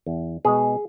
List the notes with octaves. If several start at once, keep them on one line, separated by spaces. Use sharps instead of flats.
E2
B2 G#3 G#4